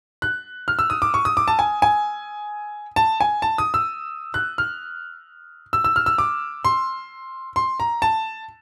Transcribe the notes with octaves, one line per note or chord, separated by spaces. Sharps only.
F#6
F6
E6
D#6
D6
C#6
D#6
D6
A5
G#5
G#5
A5
G#5
A5
D#6
E6
F#6
F6
E6
E6
F6
E6
D6
C6
C6
A#5
A5